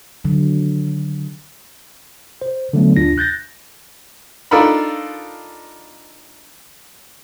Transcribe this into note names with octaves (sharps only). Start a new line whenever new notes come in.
D3 D#3 F#3
C5
D3 F#3 A3 B3
D2 D4 F4 A#6
F#6 G6 A6 A#6
D4 D#4 F4 A4 A#4 B5